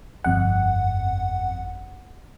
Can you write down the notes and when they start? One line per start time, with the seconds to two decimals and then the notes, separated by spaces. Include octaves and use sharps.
0.24 G1 F2 F#5